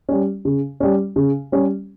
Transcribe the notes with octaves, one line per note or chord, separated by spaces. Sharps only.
G3 C#4
C#3
G3 C#4
C#3
G3 C#4